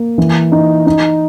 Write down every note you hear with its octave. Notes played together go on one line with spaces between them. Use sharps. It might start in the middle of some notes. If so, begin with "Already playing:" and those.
Already playing: A#3
E3
D#4
D#4